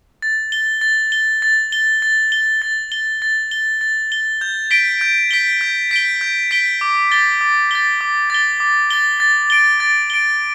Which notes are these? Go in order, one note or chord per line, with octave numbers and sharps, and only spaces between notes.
A6
G7
A6
G7
A6
G7
A6
G7
A6
G7
A6
G7
A6
G7
G6
B6 D7 G7
G6
B6 D7 G7
G6
B6 D7 G7
G6
B6 D7 G7
D6
A6 G7
D6
A6 G7
D6
A6 G7
D6
A6 G7
A6
D7 G7
A6
D7 G7